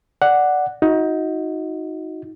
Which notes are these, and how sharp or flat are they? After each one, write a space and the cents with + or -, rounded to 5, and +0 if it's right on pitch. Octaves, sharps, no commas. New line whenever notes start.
D5 +0 F#5 +0
D#4 +25 F#4 -15